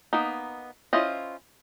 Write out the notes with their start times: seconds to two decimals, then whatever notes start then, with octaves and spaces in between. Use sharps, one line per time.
0.13 A#3 B3 D#4
0.93 C#4 E4 F4 C5 D#5